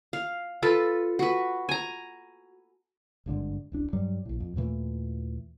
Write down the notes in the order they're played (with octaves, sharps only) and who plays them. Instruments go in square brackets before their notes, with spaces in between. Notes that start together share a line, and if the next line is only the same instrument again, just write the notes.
[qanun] F5
F4 A4 B4
F#4 B4
G#5 A#5
[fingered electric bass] G#1 G2 D3 G#3
D1 A1 D4
G2 F#3 G3
A#1 A2
F2
D#2 A#2 E3 A3